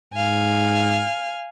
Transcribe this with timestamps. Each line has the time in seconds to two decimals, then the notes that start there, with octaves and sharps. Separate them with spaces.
0.14 G#2 F5 G#5